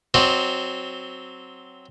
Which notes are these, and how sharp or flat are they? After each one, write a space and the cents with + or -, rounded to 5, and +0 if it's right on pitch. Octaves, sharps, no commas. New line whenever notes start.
F#3 +0 C4 +0 D#5 -40